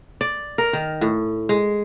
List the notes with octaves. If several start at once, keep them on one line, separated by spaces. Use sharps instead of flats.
D5
A#4
D#3
A2
G#3